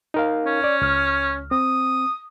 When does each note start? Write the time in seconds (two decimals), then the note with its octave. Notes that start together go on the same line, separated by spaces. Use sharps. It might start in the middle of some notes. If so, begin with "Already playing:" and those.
0.14 D#4 A#4 F5
0.46 C#4
0.64 D5
0.81 C#2 F6
1.51 C4 D#6